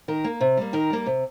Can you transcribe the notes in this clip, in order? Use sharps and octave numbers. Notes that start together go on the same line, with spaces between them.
D#3 A#4
A#3
C3
G3 A#3
D#3 A#4
G3 A#3
C3